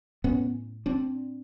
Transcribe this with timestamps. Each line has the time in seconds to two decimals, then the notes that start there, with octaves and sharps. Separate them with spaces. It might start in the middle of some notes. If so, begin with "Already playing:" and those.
0.24 A2 B3 C#4
0.86 C4 D4